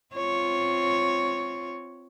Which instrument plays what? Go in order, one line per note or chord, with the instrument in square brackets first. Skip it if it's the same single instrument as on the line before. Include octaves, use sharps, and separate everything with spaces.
[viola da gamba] C4 F4 C#5